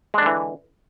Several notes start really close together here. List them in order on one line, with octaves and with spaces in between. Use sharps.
G#3 D4 D3 E3